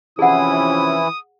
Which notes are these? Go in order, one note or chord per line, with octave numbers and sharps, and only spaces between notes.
C3 E3 F3 C#4 E4 G#4 F#5 D#6